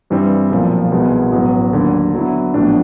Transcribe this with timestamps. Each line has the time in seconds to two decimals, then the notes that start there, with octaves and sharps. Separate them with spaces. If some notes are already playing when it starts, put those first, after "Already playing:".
0.10 G2 E3 G3 C4
0.51 B1 A#2 F3
0.92 C2 B2 G#3 B3
1.32 A1 A2 F#3 B3
1.73 D#2 D3 F#3
2.13 D3 F#3 B3 E4
2.54 A#1 A2 F#3 B3 D4